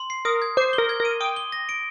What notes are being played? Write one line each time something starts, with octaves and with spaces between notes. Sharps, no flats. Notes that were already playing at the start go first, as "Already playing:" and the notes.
Already playing: C6
C7
A#4 D#6
G#6
C5 D6
G7
A#4
G#6
A#4
D#7
G5 D#6
G7
A#6
D7